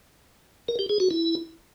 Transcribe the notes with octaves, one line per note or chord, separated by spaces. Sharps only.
A#4
G4
G#4
F#4
E4